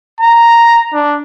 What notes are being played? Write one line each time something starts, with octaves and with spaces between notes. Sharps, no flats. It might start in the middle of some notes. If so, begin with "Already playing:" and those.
A#5
D4